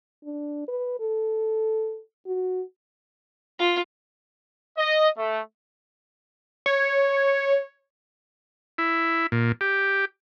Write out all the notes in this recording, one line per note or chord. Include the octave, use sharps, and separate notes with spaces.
D4
B4
A4
F#4
F4
D#5
A3
C#5
E4
A#2
G4